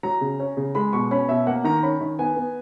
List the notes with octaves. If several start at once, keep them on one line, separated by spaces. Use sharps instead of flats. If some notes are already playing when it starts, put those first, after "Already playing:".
F#3 A#5
C#3
C#4
C#3
G#3 B5
B2 C#6
C#4 B5
B2 E5
A#3 F#5
D#3 A#5
C#4 B5
D#3
B3 G#5
B3